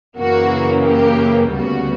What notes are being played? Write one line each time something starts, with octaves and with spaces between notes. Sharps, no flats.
F#2 C#3 E3 A#3 F#4
G4
D2 C#3 G3 B3 F#4